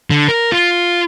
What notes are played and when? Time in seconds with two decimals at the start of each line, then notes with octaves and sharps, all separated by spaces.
0.10 D3
0.28 A#4
0.52 F4